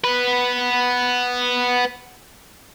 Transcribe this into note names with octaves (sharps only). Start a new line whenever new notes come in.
B3 B4